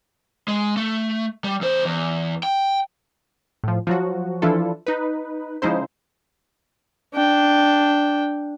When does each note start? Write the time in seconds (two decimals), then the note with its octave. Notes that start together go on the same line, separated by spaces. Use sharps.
0.48 G#3
0.77 A3
1.44 G3
1.61 E2 C5
1.85 E2
2.43 G5
3.64 A2 F3
3.87 F3 F#3 F#4
4.42 E3 F3 D4 E4 F4 A4
4.87 D#4 B4
5.62 C#3 F3 G#3 D#4 E4 C5
7.14 D4 G5